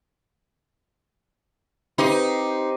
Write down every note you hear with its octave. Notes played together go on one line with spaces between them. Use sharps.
C4 D#4 G4 C5